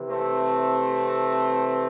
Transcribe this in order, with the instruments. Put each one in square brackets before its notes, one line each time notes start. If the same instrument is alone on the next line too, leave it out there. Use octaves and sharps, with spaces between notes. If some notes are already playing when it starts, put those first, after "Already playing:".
Already playing: [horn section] C3 E3
A3 C4